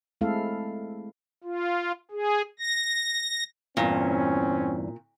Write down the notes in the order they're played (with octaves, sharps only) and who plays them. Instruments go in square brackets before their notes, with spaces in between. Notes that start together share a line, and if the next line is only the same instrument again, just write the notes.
[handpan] G#3 A3 C4 E4 A4 F5
[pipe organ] F4
G#4
A#6
[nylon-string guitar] E2 G2 [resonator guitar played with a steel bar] A#2 [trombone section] C4 C#4